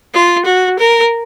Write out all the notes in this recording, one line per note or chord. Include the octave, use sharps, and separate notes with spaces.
F4
F#4
A#4